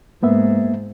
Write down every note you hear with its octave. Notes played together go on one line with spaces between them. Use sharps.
G#2 A#3 B3 E5